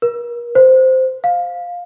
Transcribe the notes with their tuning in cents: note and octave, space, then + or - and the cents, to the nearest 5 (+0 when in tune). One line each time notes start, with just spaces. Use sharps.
A#4 +40
C5 -10
F5 +15